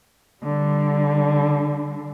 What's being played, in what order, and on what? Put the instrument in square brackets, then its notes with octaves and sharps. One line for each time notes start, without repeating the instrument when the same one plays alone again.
[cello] D3 G3